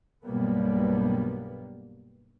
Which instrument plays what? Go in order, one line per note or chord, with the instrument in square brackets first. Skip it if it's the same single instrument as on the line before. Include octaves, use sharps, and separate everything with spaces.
[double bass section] B1 G2 G3 A#3 B3